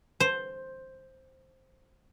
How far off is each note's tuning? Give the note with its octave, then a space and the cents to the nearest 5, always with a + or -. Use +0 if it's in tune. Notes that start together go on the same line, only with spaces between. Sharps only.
C5 +5